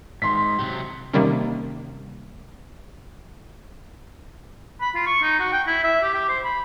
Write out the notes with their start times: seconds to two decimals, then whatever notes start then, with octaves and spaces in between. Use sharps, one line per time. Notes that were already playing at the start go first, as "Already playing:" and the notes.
0.22 G#2 D#3 C6 B6
0.59 C3 F#3 G4
1.13 C3 D#3 G3 A#3 C#4
4.81 B5
4.95 F4
5.07 C#6
5.23 D#4
5.40 F#4
5.52 G5
5.67 E4
5.84 E5
6.02 G4
6.14 G4
6.29 C5
6.44 B5